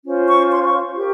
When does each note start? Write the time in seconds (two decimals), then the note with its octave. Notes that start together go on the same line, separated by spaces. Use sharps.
0.04 C#4 F4 C5
0.27 C#6
0.50 C6
0.65 C#6
0.96 G4 A#4